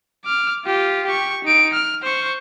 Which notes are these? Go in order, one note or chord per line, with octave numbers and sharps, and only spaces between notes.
D6 F6
F4 G4
G4 C#6
D#4 D7
F6
C5 C#6